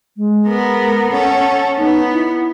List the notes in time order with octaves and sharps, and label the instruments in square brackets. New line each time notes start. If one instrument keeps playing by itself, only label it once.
[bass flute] G#3
[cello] B3 A#4
[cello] C#4 A4 [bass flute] F#5
[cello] B3 [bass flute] D#4
[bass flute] E4